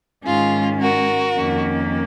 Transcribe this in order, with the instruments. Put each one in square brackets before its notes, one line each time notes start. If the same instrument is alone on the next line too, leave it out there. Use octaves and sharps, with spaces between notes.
[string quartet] G#2 D#3 G#3 C#4 F4 G#4
F#4 A#4
F2 D#3 A#3 C#4